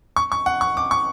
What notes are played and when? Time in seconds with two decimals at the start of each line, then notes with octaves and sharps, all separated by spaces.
0.16 C#6
0.32 C#6
0.46 F#5
0.61 C#6
0.77 D6
0.91 C#6